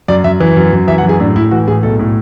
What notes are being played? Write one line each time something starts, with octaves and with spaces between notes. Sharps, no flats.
F#2 D5
F#2 E5
E3
F#2
F#2
E3 E5
F#5
F#2
G#4
A2 D4
A2 E4
E3 F#4
A2 G#4
B1 A4
A2